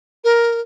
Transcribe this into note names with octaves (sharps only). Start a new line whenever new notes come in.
A#4